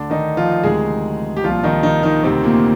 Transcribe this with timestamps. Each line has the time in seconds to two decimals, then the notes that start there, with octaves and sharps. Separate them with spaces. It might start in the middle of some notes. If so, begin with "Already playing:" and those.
Already playing: D2 D3 D4
0.10 D#3 D#4
0.37 F3 F4
0.63 D2 C3 D#3 G#3 G#4
1.37 G4
1.44 C2 A#2 F3 F4
1.63 D#3 D#4
1.83 D#3 D#4
2.03 D#3 D#4
2.23 D2 C3 D#3 C4
2.44 A#2 A#3